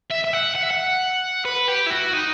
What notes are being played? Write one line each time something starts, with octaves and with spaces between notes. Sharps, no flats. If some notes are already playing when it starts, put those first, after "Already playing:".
E5
E5
F#5
F#5
E5
F#5
B4
G4
E4
F#4
D#4